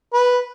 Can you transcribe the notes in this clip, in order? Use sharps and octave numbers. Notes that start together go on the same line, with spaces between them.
B4